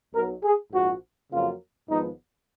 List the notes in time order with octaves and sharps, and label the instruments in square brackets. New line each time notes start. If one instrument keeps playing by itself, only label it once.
[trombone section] B1 B2 F#3 A#4
G#4
A#1 G#2 F3 F#4
F2 C#3 F#3 A#3 F4
G#1 G#2 F3 B3 D#4